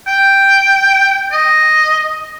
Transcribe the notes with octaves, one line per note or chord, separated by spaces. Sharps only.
G5
D#5